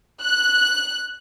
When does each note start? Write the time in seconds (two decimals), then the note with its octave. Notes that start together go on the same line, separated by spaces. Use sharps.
0.22 F#6